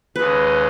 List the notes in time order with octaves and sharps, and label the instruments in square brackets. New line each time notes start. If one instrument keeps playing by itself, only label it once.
[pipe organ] D#2 C#3 G#3 [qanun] B4